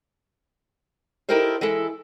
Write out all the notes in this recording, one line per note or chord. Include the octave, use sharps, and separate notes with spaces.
D#4 E4 G4 A4 A#4 C5
E3 G#3 E4 A4